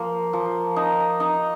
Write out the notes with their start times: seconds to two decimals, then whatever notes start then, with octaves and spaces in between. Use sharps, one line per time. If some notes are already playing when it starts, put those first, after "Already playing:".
Already playing: F3 A#3
0.33 F3
0.76 D#4
1.20 D#4